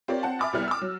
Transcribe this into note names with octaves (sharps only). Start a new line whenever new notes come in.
C4 F4 G4 A#4 C#5 D5
C4 F#5 A5
E5 G#5 B5 D6 F6 A6
C2 G3 B3 E4 F6
D6 E6
F#3